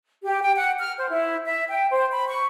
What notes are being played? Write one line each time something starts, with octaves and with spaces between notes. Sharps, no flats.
G4
G5
F#5
F6
C5
E4
E5
G5
C5
B5
C#6